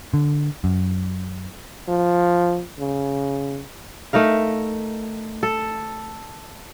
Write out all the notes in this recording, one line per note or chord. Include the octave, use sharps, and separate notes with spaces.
D3
F#2
F3
C#3
A3 D#4 A#4 F5
A4